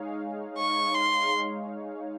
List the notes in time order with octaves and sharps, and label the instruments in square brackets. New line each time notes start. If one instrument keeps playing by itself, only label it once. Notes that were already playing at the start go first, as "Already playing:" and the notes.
Already playing: [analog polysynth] G#3 D#4 G#4 C#5 F5
[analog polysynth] G#3 D#4 G#4 C#5 F5 [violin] C#6
[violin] C6